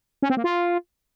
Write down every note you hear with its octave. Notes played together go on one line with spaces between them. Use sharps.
C#4
C4
A#3
F4